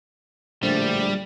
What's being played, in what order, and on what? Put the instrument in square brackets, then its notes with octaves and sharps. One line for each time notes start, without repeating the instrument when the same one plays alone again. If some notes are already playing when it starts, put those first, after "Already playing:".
[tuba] A#1 [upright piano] A2 D3 [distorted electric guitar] G3 [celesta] C5 E5 A6